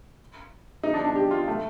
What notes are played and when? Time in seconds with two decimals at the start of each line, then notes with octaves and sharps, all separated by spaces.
0.83 D#4
0.94 D4
1.05 D4
1.16 G4
1.31 F4
1.48 A3